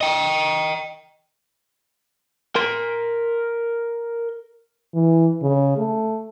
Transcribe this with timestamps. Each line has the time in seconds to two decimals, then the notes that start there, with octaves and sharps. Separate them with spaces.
0.01 D#5 G5
2.56 A#4 C6
4.94 E3
5.42 C#3
5.78 A3